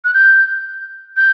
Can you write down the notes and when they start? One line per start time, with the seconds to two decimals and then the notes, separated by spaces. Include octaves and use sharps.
0.05 F#6
0.14 G6
1.17 G6